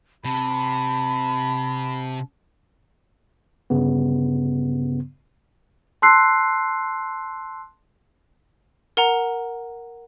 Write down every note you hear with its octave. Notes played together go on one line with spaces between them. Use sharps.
C3 A5 B5
G1 G2 C#3 B3
A5 C6 E6 F#6 C7
A#4 F#5 A#5